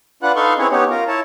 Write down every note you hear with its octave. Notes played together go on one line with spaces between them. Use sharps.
D4 F4 B4 F#5 F#6
D#4 A4 B4 F5 C6 C#6
C4 C#4 E4 G#4 B4 C#5
B3 C#4 D#4 G4 C#5
F4 A#4
E4 C#5 A5